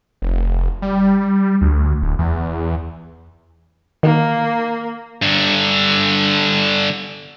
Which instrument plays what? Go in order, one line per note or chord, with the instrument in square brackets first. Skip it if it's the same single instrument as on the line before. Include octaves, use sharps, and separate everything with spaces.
[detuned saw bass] F1
G3
D2
D1
E2
[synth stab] D#3 [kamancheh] A#3
[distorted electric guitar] G2 D3